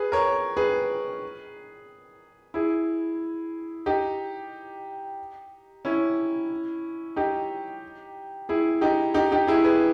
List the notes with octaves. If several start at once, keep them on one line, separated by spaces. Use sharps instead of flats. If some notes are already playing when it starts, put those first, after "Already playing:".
Already playing: G#4 B4
A#4 C#5
G#4 B4
E4 G#4
D#4 G4
C#4 E4
D#4 G4
E4 G#4
D#4 G4
D#4 G4
D#4 G4
E4 G#4
G#4 B4